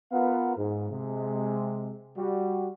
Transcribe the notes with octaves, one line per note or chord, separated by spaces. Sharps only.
B3 F4 A#4 B4 F5 F#5
G#2
C3 G#3
G3 F#4